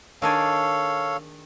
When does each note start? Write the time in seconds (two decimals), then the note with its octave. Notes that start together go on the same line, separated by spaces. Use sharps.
0.22 D#3 D4 G#4 A4 C#5 F5